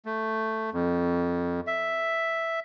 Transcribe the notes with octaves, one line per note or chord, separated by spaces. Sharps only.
A3
F2
E5